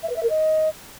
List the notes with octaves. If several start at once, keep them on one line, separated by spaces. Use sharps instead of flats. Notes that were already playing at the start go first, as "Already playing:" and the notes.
E5
B4
E5
A#4
D#5